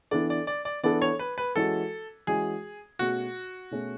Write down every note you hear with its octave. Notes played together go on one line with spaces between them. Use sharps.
E3 B3 D4 A4 D5
D5
D5
D5
E3 B3 D4 A4 D5
C#5
B4
B4
E3 G#3 C#4 F#4 A4
E3 G#3 C#4 F#4 G#4
B2 A3 C#4 F#4 G#4
B2 A3 C#4 G#4